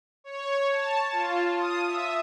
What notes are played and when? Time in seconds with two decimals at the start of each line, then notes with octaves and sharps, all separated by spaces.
0.24 C#5
0.71 A5
1.12 F4
1.56 D#6
1.87 E5